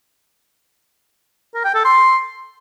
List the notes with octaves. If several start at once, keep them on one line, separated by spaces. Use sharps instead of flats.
A#4
G5
A4
C6